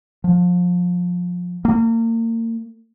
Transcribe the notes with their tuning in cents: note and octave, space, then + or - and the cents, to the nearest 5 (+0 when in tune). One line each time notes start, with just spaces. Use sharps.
F3 +25
A#3 -35